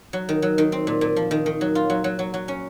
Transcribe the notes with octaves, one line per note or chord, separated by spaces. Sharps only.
F#3
D#3
F#3
D#3
C4
A#2
A#2
F3
D#3
D#3
F#3
F4
F#3
F#3
F#3
F#3
C#4